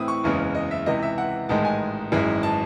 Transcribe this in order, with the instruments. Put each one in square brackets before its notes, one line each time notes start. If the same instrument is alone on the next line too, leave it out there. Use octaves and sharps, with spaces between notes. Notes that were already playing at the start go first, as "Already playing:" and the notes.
Already playing: [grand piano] A2 E3 C4 E4 D#6 E6
C#6
F#1 E2 C#3 G#3
D#5
E5
C#2 C3 E3 D#5
E5
F#5
A1 G#2 D#3 G#3 D#4 A5
G#5
G#1 F#2 E3 G#3
A5